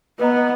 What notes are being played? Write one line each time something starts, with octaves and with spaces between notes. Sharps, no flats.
B3 B4 D#5 A#5